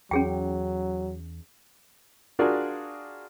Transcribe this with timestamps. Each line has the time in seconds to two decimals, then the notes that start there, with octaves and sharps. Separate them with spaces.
0.11 E2 F#3 C#4 G#4 G5
2.39 D4 F4 F#4 G#4 A#4 D5